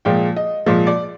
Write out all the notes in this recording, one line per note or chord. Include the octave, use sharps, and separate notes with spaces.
A#2 F3 G#3 G5
D#5
A#2 F3 G#3
D5